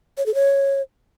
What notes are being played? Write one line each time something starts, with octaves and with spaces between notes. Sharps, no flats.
C#5
A4
C#5